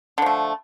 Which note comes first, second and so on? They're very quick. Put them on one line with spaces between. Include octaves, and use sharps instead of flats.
D3 F3 A3